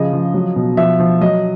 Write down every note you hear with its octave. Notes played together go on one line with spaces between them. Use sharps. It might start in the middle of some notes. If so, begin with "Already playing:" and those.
Already playing: C#3 F3 D#5
F3
F#3
B2
F3 E5
F3
F#3 D#5